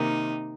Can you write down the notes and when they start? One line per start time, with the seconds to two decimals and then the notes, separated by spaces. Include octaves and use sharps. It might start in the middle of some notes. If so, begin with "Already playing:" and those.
Already playing: C3 D#3 A#3 D#4